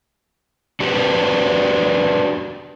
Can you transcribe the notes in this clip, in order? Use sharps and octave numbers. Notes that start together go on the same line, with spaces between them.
D4 F#4 G4 B4